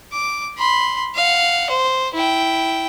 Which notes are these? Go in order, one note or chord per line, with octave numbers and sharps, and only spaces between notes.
D6
B5 C6
F5 F#5
C5
E4 G5